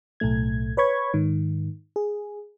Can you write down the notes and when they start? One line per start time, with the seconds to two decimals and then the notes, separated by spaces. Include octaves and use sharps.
0.20 B1 A2 A3 G#6
0.77 B4 C#5 B5 C#6 G#6
1.14 G#2 D#3
1.96 G#4